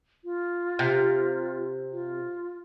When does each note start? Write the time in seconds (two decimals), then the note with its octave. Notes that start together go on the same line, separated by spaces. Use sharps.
0.25 F4
0.79 C3
1.92 F4